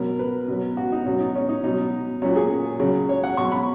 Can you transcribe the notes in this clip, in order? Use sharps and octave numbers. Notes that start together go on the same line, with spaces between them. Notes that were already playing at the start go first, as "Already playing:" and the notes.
Already playing: B2 F#3 A#4
B4
B2 F#3
F#4
D#4
B2 F#3 C#4
D#4
C#4
D#4
B2 F#3 D#4
A#2 F#3 C#4
G#4
C#3 F#3
C#5
F#5
B2 F#3 C#6
B5